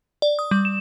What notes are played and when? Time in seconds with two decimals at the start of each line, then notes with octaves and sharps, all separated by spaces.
0.22 D5
0.39 D#6
0.51 G3
0.65 E7